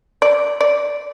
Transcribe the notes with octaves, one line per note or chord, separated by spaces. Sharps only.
D5
D5